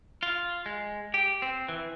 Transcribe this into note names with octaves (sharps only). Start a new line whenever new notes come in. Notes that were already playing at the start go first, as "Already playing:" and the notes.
F4
G#3
G4
C4
E3